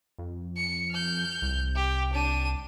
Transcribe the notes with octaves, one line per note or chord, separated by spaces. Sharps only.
F2
C#7
F6 G6
C2
G4
D4 D#7